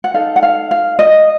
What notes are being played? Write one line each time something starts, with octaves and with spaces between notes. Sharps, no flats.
F#5
D#4 A4 F5
F#5
F5
F5
D#5